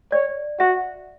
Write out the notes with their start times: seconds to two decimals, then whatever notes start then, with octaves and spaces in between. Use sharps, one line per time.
0.12 C#5 D5
0.59 F#4 E5